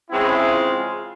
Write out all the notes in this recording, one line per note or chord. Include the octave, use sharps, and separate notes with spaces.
C#3 E3 G#3 C4 E4
F4